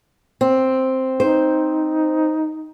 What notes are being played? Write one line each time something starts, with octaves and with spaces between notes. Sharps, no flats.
C4
D#4 C5